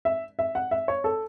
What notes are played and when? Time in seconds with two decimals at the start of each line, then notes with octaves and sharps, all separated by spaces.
0.05 E5
0.39 E5
0.55 F#5
0.71 E5
0.88 C#5
1.04 A4